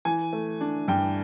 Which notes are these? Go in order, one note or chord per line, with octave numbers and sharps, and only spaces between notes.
E3 G#5
A3
D4
G2 G5